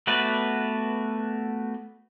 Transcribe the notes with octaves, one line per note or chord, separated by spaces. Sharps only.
A3 B3 F#4 B4 D5